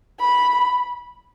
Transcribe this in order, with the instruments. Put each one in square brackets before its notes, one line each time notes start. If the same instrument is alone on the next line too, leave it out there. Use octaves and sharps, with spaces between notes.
[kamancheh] B5